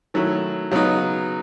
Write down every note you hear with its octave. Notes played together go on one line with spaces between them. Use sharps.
D#3 F#3 A3 C#4 E4
C#3 F#3 B3 D#4